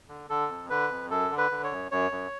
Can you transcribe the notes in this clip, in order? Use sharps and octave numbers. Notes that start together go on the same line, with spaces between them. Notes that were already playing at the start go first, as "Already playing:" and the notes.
D3
D3 A4
F2
D3 B4
F2
F#2 A4
D3
B4
D3
C#5
F#2
F#2 C#5
F#2